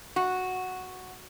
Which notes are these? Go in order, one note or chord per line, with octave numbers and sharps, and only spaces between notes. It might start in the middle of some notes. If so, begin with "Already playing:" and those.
F#4